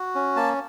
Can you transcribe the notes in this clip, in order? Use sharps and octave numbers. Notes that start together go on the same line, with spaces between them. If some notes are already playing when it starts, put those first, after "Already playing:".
Already playing: F#4
C#4
A#3 A5